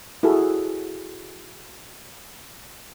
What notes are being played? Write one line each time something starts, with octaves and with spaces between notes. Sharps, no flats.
E4 F#4 G#4 A4